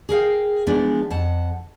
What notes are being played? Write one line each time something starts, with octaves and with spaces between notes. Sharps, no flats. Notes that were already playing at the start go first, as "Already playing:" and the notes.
G#4 A#4 F5 G5
E3 F3 G#3 B3 D4
F2 F#5 A5